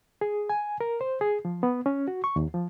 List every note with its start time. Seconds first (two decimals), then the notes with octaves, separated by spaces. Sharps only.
0.21 G#4
0.49 G#5
0.81 A#4
1.01 C5
1.21 G#4
1.45 F3
1.63 B3
1.86 C#4
2.08 F#4
2.24 C#6
2.36 D#2
2.54 F3